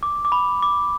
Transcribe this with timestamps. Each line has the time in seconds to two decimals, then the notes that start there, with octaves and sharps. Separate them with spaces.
0.03 D6
0.25 D6
0.32 B5
0.63 D6